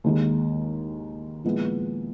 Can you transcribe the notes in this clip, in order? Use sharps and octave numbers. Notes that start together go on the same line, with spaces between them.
D#2 D#3 G#3
A#2 F3 G#3 B3 E4